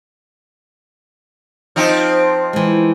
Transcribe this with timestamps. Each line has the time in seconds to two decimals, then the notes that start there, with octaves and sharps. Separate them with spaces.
1.76 F3 C4 D#4
2.53 E3 G#3